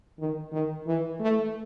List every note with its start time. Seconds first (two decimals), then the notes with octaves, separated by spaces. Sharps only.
0.19 D#3
0.52 D#3
0.87 E3
1.20 A3